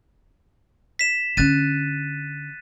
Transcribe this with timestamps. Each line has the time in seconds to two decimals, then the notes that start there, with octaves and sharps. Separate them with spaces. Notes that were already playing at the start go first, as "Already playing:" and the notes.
0.99 B6 E7
1.37 D3 C#4 F#6 A6 D#7